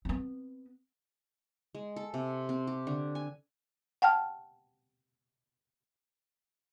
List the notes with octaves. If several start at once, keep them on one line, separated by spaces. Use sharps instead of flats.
B3 C4
G#3
A4
C3
C4
G4
D3
G#5
F#5 G5 A5 F6